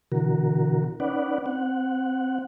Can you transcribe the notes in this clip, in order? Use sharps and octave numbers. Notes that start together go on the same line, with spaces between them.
B2 D3 E3 F#4 A#4
C#4 D#4 B4 D5 F#5
C4 F#5